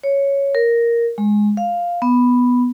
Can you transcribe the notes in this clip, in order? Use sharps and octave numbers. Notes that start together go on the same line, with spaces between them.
C#5
A#4
G#3
F5
B3